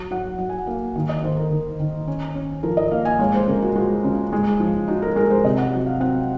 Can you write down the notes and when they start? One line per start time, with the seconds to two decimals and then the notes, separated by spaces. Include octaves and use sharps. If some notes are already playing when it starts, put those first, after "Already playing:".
Already playing: F#3
0.11 F#3 F#5
0.38 F#3 F#5
0.49 G#5
0.59 F#5
0.67 A#3 F5
0.95 D#3 F5
1.09 D#5
1.23 D#3 C5
1.37 A#4
1.51 D#3
1.80 D#3
2.07 C#4
2.35 C#4
2.63 F3 A#4
2.77 D#5
2.91 A#3 F5
3.05 G#5
3.19 G#3 C#5
3.34 C5
3.48 C#3 A#4
3.62 F#4
3.76 G#3 F#4
4.04 C#3
4.33 G#3
4.60 F3
4.88 D#4 F#4
5.02 A#4
5.16 G#3 A#4
5.30 C5
5.44 C3 D#5
5.58 F#5
5.72 F#3 F#5
5.86 F5
6.00 C4 F#5